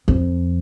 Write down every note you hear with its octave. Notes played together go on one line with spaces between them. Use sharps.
F2